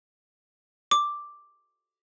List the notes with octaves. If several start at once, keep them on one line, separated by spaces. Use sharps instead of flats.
D6